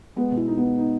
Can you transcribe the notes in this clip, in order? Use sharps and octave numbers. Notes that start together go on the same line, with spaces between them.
G#3 B3
B2 E4
D#4
B3
D#4
D#4